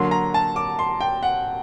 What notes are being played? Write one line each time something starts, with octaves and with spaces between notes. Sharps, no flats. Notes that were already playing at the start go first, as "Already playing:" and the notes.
Already playing: D3 F#3 A#3 C6
A#5
A5
D6
C6
G5
F#5